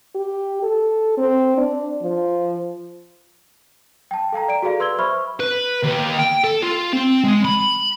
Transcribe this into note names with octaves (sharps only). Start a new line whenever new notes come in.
G4
A4
C4
D4
F3
G5 A5
A4 F5 G5 A#5
D5 A#5 D7
F#4 G#4 A4 D5 F5
B4 C6 E6 G#6 G7
C5 E5 B5 C#6 F6
B4
D#2
G5
A4
F4
C4
G#3
B5